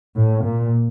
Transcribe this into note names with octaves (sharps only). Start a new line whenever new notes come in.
A2
A#2